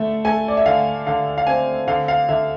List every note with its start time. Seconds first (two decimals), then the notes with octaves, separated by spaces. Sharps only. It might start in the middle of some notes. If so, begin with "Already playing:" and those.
Already playing: D3 A3 E5
0.25 A3 G#5
0.48 D5
0.57 E5
0.66 D3 F5
1.07 D3 F5
1.38 F5
1.47 C4 G#5
1.87 D3 F5
2.08 F5
2.29 D3 E5